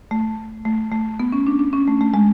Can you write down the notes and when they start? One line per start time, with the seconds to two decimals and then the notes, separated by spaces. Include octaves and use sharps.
0.11 A3
0.65 A3
0.92 A3
1.20 B3
1.32 C#4
1.47 D4
1.59 D4
1.73 C#4
1.87 A3
2.01 A3
2.14 G#3